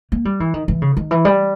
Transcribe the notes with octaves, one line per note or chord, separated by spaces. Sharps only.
A#3
G3
E3
D#3
E3
C#3
D#3
E3
G3